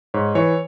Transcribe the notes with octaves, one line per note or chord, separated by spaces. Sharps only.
G#2 C#5
E3 C#5